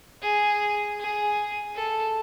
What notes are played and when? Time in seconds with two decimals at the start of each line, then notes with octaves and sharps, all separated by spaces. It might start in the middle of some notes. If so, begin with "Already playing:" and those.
0.22 G#4
0.99 G#4
1.75 A4